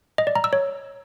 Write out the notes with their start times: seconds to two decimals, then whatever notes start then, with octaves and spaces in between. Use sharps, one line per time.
0.18 D#5
0.27 D5
0.35 A#5
0.44 E6
0.53 C#5